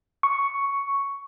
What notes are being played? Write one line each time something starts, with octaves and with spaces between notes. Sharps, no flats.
C#6